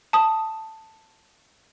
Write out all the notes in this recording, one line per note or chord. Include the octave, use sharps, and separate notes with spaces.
A5 D#6